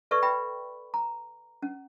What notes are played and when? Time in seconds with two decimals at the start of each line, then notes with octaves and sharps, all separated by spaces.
0.11 A4 B4 D5 E5 C#6
0.22 B4 E5 G5 B5
0.94 A#5
1.62 C#4